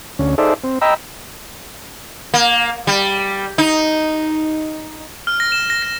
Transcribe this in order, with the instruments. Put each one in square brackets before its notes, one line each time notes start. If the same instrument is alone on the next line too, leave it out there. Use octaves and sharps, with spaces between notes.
[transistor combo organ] D2 C#4
D#4 G#4 A4 C5 D5 E5
C4
D#5 G5 A#5 B5 E6
[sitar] A#3
G3
D#4
[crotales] F6
A#6
E7
A#6
A#6